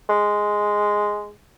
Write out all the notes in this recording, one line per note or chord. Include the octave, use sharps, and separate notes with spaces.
G#3